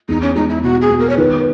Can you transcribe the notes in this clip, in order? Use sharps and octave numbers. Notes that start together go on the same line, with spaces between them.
E2 D#4
C#4
G#3 D#4
E4
B2 F#4
G#4
B3
A#4
C#5
D#3 B4